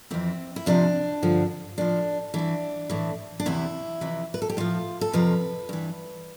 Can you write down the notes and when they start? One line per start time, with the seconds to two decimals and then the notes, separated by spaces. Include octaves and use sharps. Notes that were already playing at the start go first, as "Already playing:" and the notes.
0.11 F2 E3 C4
0.56 E4
0.66 F2 C3 F3 D4
1.23 G2 D3 F3
1.78 A2 F3 D4
2.34 G2 E3 D4
2.90 A2 E3
3.40 D4
3.46 E2 C3 E3 E4
4.01 F2 C3 E3
4.34 B4
4.42 A4
4.49 G4
4.57 A2 F3 F4
5.01 A4
5.13 F2 C3 F3 B4
5.69 G2 E3